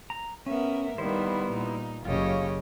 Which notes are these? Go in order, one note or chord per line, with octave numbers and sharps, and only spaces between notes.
A#5
B3 C#4 A#4 E5
D#3 G3 A#3 B3 E4 C5
A#2 D#4
F#1 C#3 F4 G4 C#5 D#5